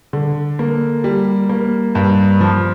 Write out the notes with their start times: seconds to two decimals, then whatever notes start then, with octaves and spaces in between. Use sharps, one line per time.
0.13 D3
0.59 A#3
1.04 G3
1.49 A#3
1.95 G2
2.41 F3